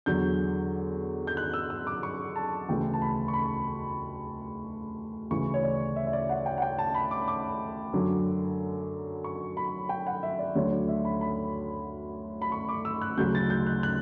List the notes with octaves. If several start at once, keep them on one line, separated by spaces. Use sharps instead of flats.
E2 D3 F#3 G6
G6
F#6
E6
E6
D6
C#6
A5
D2 C#3 E3 G5
A5
B5
C#6
B5
D2 C#3 E3 C#6
C#5
D5
E5
E5
D5
F#5
G5
F#5
G5
A5
B5
D6
D6
F#2 D3 F#3
C#6
B5
G5
F#5
E5
D5
D2 D3 F#3 C#5
D5
E5
B5
B5
B5
C#6
D6
E6
F#6
D2 C#3 F#3 G6
A6
G6
F#6
F#6